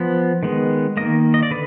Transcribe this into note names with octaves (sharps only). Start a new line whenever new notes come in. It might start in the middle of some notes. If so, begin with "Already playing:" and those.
Already playing: F3 B3
D#3 G#3 B3
D#3 A#3 D#5
D#5
D5
D3 B4